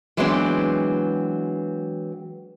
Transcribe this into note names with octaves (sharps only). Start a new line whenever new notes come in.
E3 F#3 G#3 B3 C4 D4